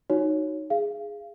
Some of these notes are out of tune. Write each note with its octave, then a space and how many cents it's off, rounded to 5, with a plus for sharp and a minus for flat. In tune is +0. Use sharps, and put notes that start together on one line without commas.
D#4 +0 F#4 +0 C#5 +0
G#4 +0 F5 -30